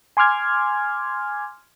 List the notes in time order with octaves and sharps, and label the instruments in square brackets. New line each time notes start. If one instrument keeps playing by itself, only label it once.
[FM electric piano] G#5 C6 D6 F6 G#6